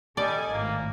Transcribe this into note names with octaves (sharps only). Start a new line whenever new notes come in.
G3 A4 D5 D#5 G#5
G#1 A2 A#3